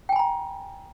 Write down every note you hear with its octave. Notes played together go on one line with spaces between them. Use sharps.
G5 G#5 A#5 B5